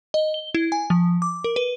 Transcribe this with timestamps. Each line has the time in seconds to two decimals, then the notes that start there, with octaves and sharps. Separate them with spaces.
0.14 D#5
0.34 G7
0.55 E4
0.72 G#5
0.90 F3
1.22 D6
1.44 A#4
1.56 B4